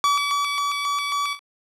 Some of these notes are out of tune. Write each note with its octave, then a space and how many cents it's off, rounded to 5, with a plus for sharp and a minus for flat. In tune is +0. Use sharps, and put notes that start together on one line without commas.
D6 -45